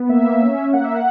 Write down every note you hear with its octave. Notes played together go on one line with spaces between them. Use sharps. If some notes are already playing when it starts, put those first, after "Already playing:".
Already playing: B3
A#3 E5
C#4
A#3 F#5
E5
F#5